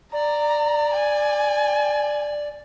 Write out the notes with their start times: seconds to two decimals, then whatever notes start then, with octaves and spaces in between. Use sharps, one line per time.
0.13 D5 A#5
0.95 G#5